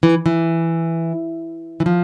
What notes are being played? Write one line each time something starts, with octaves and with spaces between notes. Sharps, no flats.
E3
E3
E3
F3